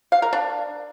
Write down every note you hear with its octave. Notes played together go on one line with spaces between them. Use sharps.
F5
A#4
D4